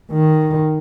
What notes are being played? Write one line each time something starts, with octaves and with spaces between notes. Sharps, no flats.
D#3